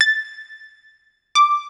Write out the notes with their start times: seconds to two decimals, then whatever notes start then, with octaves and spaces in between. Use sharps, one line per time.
0.01 A6
1.35 D6